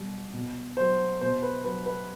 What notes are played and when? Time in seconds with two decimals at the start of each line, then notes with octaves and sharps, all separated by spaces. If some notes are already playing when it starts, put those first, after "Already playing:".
Already playing: B2 G3
0.34 B2
0.77 F#3 C5
1.21 B2 C5
1.42 B4
1.64 F#3 B4
1.86 B4